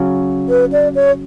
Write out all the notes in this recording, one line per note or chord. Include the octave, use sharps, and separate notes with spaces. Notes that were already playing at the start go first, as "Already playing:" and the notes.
Already playing: C#3 F#3 C#4
B4
D5
C#5